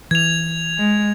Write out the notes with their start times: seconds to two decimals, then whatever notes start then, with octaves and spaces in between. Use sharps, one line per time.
0.11 E3 G#6 F7
0.78 G#3